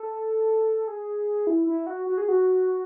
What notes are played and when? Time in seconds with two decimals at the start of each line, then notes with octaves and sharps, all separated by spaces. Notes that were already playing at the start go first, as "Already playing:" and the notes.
Already playing: A4
0.88 G#4
1.47 E4
1.67 E4
1.87 F#4
2.06 F#4
2.18 G#4
2.28 F#4